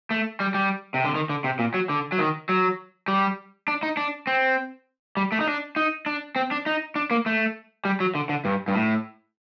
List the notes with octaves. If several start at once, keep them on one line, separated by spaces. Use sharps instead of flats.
A3
G3
G3
C3
D3
D#3
D3
C3
A#2
F#3
D3
F#3
D#3
F#3
G3
D4
D#4
D4
C4
G3
A3
D#4
D4
D#4
D4
C4
D4
D#4
D4
A#3
A3
G3
F#3
D3
D3
G2
G2
A2